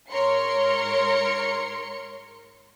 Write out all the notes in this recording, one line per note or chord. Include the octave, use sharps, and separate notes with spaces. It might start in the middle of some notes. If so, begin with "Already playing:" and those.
G#2 A#4 C#5 C6 C#7